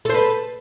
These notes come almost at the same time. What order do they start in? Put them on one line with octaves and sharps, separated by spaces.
A4 C5 B4